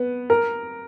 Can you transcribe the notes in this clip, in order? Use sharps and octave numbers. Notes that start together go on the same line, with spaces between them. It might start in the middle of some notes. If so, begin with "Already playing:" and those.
Already playing: B3
A#4